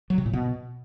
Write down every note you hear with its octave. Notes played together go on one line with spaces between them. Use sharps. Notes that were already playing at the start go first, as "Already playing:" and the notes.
F#3
C3
A#2
B2